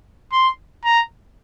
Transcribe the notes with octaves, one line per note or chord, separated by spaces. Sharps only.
C6
A#5